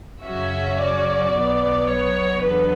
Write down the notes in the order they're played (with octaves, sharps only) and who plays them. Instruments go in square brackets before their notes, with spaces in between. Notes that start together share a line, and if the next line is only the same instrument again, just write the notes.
[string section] F#2 C#3 F#3 C#4 F#4 [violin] E5
[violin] D5
[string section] B1 B2 F#3 B3
[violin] C#5
[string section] E2 D3 F#3 B3 [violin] B4